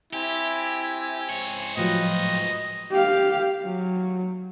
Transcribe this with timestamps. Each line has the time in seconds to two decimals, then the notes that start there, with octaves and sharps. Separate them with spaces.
0.13 C4 E4 G4 G#5
1.29 G#2 C#5
1.77 A2 F3 F#3 F4 B4 D#5 G5
2.92 G4 F5
3.66 F#3